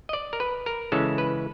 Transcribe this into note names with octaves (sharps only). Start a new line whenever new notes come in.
D#5
D5
A#4
B4
A#4
C#3 E3 G#3 C#4 A4
B4